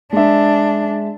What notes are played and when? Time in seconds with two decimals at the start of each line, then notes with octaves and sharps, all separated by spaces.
0.13 G#3 D4 E5